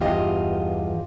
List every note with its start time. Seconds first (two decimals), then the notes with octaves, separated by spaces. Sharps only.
0.01 E2 G2 F4 G4 D#5